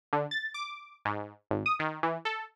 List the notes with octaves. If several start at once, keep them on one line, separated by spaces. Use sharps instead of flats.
D3
A6
D6
G#2
G#1
D#6
D#3
E3
A4